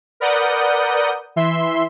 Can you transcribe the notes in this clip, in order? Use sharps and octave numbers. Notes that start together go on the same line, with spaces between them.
A#4 B4 D5 F#5 D#6 G6
E3 E5 C6